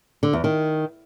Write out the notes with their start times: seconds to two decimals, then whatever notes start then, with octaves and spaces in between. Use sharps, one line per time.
0.23 D3
0.33 E2
0.44 D#3